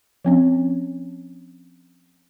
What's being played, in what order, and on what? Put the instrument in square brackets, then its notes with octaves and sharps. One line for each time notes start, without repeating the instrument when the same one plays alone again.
[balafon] F3 C4 C#4